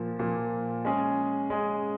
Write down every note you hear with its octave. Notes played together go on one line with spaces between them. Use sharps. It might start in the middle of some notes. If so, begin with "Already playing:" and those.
Already playing: A#2 F3 A#3
A#2 F3 A#3
G#3 C#4 G#4
G#3 C#4 G#4